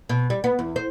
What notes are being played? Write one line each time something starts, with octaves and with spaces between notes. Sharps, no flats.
B2
G3
B3
E2
C5